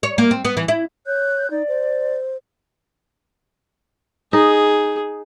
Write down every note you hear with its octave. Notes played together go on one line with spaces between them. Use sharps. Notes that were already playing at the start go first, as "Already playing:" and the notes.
C#5
A#3
C4
B3
E3
E4
C#5 F#6 G6
D#4 D5
C5
D#4 G#4